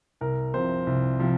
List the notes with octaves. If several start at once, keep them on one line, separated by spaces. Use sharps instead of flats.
C2 A#4
C3 F3 C5
C2
C3 F3